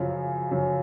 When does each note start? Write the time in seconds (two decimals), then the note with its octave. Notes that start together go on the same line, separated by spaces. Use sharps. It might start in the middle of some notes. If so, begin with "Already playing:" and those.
Already playing: F#2 C#3 F3
0.51 F#2 C#3 F3